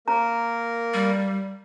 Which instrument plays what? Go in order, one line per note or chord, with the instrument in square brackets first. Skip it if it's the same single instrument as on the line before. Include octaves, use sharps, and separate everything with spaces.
[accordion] A#3 A#4 [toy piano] A#5
[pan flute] G3